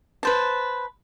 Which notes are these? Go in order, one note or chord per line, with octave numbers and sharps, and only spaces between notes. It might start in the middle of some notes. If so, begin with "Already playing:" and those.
B4 C5 A5